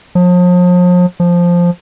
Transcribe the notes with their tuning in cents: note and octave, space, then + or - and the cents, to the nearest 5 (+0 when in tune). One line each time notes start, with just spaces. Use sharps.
F3 +40
F3 +0